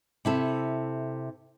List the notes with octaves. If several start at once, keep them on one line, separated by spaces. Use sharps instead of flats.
C3 E4 A4